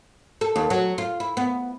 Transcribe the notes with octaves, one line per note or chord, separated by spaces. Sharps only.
A4
D#2
F#3
F4
E4
B3